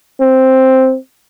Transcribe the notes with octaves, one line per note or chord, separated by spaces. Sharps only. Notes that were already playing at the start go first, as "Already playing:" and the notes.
C4